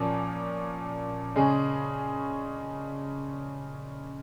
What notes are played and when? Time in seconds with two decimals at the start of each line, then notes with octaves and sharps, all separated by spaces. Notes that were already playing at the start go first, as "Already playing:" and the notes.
Already playing: A#2 F3 C#4
1.36 C#3 G#3 C#4 G#4